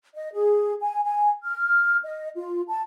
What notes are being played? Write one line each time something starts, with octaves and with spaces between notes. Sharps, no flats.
D#5
G#4
G#5
G#5
F6
D#5
F4
A5